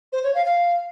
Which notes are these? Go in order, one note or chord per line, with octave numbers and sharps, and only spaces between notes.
C5
C#5
F5
F5